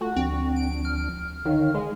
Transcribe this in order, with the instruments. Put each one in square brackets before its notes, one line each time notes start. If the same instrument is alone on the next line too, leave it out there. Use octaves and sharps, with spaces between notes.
[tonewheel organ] A3 F4 A4 [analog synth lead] F#4
[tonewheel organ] D2 F3 D4 [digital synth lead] C4
[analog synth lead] D7
[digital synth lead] F6
[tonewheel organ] D3 C#5 F5 [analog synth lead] D#3
[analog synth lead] G#3